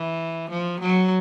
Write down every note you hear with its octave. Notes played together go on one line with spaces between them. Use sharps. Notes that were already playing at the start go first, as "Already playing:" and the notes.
Already playing: E3
F3
F#3